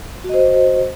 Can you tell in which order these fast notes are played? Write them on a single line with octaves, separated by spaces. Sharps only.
F#4 D#5 C5